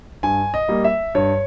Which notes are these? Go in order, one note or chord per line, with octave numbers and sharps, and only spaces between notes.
G2 G#5
D#5
G3 A#3
E5
G2 C#5